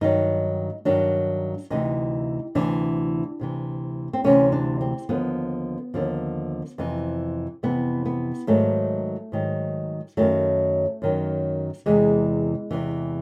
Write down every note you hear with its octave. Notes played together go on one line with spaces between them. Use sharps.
G2 D#3 F#3 D#4
G2 D#3 F#3 D4
D2 C3 E3 D#4
D2 C3 E3 D4
D2 C3 E3
C4
D2 C3 E3 C#4
D4
C4
D#2 D3 F3 B3
D#2 D3 F3
F2 C3 E3
F2 C3 E3 B3
B3
G#2 D#3 F#3 A3
G#2 D#3 F#3
F#2 D#3 F#3 A3
F#2 D#3 F#3
E2 C3 E3 G#3
E2 C3 E3